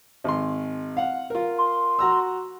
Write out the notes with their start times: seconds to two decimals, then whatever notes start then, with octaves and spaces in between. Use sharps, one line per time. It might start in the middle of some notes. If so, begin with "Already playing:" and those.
0.24 G#1 C6
0.97 F5 F#5
1.30 F4 A#4
1.58 C6
1.99 F#4 A#5 E6